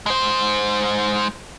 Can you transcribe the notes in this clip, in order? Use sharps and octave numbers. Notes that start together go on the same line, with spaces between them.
G#3 C5